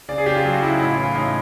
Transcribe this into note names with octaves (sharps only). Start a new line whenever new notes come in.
C#3 D5
G#4
C#3 G4
F4
F#3 G4
F#4
C#3 E4
D#4
A2 E4
F4
E3
F4
A2 D#4